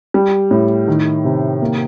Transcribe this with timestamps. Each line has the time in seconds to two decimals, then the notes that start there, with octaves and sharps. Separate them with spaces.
0.14 G3
0.51 A2
0.88 D#3
1.25 C3
1.62 A#3